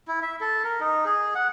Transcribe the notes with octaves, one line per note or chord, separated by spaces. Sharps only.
E4
E5
A4
A#4
D#4
G#4
F#5